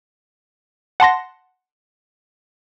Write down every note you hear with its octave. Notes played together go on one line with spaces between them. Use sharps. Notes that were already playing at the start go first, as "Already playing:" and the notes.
F#5 A5 C6 A#6